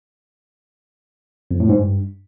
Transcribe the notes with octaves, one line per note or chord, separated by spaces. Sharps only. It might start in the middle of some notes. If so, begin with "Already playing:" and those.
F2
A2
G#2
G2